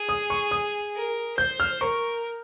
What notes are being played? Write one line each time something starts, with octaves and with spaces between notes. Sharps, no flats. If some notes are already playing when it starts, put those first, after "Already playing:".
Already playing: G#4
D#6
C#6
D#6
A#4
C5 G6
F6
A#4 C#6